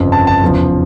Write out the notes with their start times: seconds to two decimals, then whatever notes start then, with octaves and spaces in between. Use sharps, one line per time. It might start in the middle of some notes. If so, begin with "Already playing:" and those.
Already playing: G1 F2 C#3 F3
0.12 A5
0.27 A5
0.42 F1 E2 C#3 F3